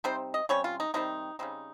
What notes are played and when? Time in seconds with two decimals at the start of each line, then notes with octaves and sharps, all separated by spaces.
0.04 C3 G3 C4 D#4 C5
0.34 D#5
0.49 C3 G3 C#4 C#5
0.64 F4
0.80 D#4
0.94 C3 D#3 G3 C4 D#4
1.39 C#3 G3 C4 D#4